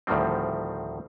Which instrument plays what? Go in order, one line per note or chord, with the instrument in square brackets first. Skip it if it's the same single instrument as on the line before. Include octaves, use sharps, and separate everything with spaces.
[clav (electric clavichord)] D2 A2 D#3 F3 G3 C4